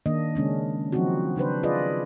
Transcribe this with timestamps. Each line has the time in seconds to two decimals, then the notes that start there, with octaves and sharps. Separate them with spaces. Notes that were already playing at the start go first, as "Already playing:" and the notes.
0.06 D#3 A#3 D4 D#5
0.35 C#3 G#3 C#4 D4
0.92 D#3 F3 F#3 C4 D#4 F#4
1.36 C#3 D4 B4 C5
1.63 F4 G#4 B4 D5 D#5